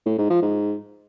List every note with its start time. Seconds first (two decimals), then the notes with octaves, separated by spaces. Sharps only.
0.06 A2
0.18 G#2
0.30 F3
0.42 G#2